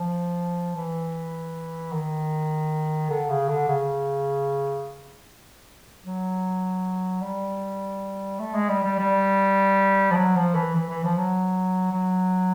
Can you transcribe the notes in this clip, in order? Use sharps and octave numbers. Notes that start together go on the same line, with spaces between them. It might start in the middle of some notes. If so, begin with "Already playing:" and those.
Already playing: F3
E3
D#3
D3
C#3
D3
C#3
F#3
G3
A3
G#3
G3
G3
G3
F3
F#3
F3
E3
E3
E3
F3
F#3
F#3